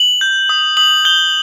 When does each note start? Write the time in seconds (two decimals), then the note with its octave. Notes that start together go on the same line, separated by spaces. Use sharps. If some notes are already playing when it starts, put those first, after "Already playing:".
Already playing: F#7
0.21 G6
0.49 D#6
0.77 D#6 F#7
1.05 G6 G7